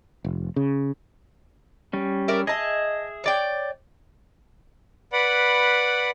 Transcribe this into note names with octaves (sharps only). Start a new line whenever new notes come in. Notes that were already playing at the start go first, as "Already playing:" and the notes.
F1
C#3
G3 C#4
A#4 D5 E5
G#4 D#5 E5 A5
C#5 D5 G5
B4 D5 F#5 B5